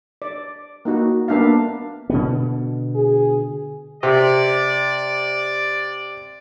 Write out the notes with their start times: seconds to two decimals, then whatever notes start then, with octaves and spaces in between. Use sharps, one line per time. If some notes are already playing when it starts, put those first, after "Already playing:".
0.22 D5
0.85 A#3 D#4 F#4
1.28 A#3 B3 D4 E5 F5
2.10 B2 D3 B3
2.95 G#4
4.03 C3 D5